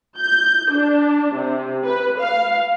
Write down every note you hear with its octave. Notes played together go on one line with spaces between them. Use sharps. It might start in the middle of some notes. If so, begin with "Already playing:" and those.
G6
D4
C3
B4
F5